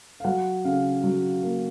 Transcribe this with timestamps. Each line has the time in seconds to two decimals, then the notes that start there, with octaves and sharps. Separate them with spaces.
0.20 F5
0.24 F#3 F#5
0.65 C#3 F5
1.04 F#3
1.43 A#3